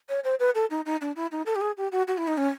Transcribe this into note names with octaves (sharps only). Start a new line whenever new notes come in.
C#5
C5
B4
A4
D#4
D#4
D4
E4
D#4
A4
G4
G#4
G4
F#4
F#4
E4
D#4
C#4